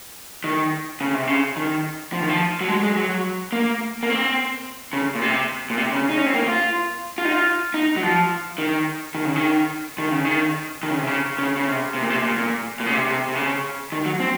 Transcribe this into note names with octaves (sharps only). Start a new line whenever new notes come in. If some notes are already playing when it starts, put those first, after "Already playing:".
D#3
C#3
C3
C#3
D#3
F3
D#3
F3
F#3
G#3
G#3
F#3
A#3
A#3
C4
C#3
A#2
C3
A#2
C3
C#3
D#4
C#4
C4
A#3
F4
F4
D#4
F4
D#4
F#3
F3
D#3
D#3
C#3
D#3
D#3
C#3
D#3
D#3
C#3
C3
C#3
C#3
C#3
C3
C3
A#2
C3
A#2
A#2
A#2
C#3
C3
C3
C3
C#3
D#3
F#3
C4